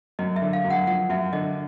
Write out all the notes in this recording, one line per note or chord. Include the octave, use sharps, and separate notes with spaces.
F#2 D#5
E5
D3
F5
F#2
F#5
F3 F#5
F#2 E5
D3 D#5